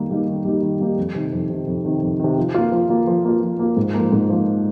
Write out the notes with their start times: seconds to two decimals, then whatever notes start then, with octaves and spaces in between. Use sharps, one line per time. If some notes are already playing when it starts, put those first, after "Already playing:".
Already playing: D#3 G3 A#3 D#4 G4
0.10 G3 A#3 D#4 G4
0.28 D#3
0.45 G3 A#3 D#4 G4
0.62 D#3
0.80 G3 A#3 D#4 G4
0.97 F2
1.15 C3 D#3
1.32 F2
1.50 C3 D#3
1.67 F2
1.85 C3 D#3
2.02 F2
2.20 C3 D#3
2.37 F3
2.54 A#3 F4
2.72 F3
2.89 A#3 F4
3.07 F3
3.24 A#3 F4
3.41 F3
3.59 A#3 F4
3.77 G#2
3.94 F3 A#3
4.12 G#2
4.30 F3 A#3